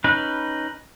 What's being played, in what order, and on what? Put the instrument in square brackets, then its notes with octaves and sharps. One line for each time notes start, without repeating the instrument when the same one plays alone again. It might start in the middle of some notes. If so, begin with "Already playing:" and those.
[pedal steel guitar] C#4 D#4 B4